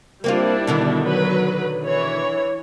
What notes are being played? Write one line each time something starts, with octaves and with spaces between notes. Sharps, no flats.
G3 A#3 C4 D4 E4 F4
B2 D3 D#3
F#3 B4
E3 C#5